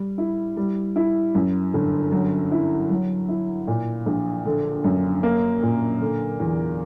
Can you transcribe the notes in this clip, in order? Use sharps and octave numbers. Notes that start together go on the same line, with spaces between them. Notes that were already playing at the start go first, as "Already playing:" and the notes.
Already playing: G3
E4
G3
E4
F#2
G1
F#3
E4
F#3
E4
A#2
A#1
D3
F#2
A#3
A#2
D3
E2